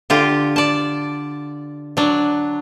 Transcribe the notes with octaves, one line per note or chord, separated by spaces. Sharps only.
D3 F4 G4
D5 A5
F#3 D4